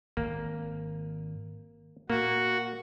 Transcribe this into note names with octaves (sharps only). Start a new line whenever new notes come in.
G#1 A#3
A#2 A#3 F#4